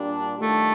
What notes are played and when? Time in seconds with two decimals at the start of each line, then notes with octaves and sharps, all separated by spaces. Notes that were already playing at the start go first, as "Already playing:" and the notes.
Already playing: A#2 G3 D4
0.39 D#3 G3 A3 D4 F4